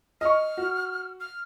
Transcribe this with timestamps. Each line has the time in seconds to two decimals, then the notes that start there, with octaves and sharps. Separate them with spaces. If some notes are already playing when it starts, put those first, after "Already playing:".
0.21 D#5 C#6 F6
0.57 F#4
1.20 F6